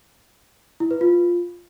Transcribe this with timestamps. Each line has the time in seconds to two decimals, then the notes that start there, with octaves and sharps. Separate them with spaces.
0.80 E4
0.91 B4
1.01 F4